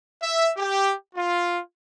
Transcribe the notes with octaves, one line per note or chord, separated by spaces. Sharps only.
E5
G4
F4